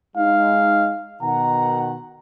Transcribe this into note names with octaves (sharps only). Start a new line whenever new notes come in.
G#3 D#4 F5
B2 D#3 F#5 A#5